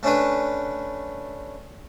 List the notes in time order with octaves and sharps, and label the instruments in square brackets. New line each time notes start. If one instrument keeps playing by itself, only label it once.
[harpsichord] A3 C#4 D4 B4